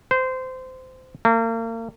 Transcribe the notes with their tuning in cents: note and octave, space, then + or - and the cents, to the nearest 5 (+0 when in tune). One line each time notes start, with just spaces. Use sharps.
C5 -20
A#3 -40